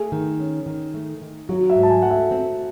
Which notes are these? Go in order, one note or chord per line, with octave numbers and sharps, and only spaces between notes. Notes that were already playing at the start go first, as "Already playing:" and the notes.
Already playing: A3 G#4
D#3
C#4
D#3
A3
D#3
F#3 F#4
E5
G#2
A5
G#5
A3 F#5
E5
C4